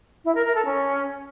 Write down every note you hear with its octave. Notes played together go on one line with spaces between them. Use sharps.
E4
A#4
A#4
A4
C#4